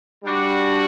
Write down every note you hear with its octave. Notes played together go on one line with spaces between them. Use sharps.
G3 D4 F#4